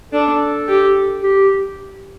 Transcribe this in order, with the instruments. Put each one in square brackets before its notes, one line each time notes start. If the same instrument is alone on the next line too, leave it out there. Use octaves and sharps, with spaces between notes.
[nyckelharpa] D4 [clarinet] A4
[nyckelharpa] G4
[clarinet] G4